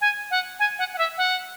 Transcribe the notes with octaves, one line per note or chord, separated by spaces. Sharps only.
G#5
F#5
G#5
F#5
F#5
E5
F#5